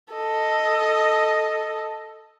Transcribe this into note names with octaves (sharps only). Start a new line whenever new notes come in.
A4 D#5